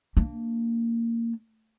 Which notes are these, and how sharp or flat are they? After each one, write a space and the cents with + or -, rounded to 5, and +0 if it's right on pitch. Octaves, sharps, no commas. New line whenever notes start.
A#3 -15 D4 +5